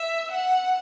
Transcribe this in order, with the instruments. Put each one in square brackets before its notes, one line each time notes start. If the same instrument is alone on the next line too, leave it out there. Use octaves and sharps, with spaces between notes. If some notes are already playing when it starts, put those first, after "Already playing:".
Already playing: [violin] E5
F#5